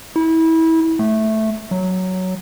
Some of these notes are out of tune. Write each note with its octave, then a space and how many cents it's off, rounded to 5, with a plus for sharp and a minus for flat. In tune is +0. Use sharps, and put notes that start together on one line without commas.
E4 -25
A3 -5
F#3 +5